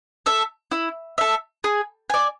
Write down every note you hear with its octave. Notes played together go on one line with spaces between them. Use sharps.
A4 E5
E4
A4 E5
G#4
D5 G#5